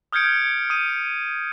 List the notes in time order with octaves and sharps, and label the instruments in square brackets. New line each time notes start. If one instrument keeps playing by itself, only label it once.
[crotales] D#6 F6 G6 G#6 C#7 D7
D#6 D#7